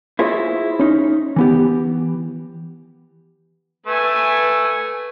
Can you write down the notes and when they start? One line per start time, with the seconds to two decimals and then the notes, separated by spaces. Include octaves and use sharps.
0.19 E4 F4 G#4 C5 C#5 D#5
0.79 C#4 D#4
1.36 E3 B3 G4
3.86 A3 B4 G#5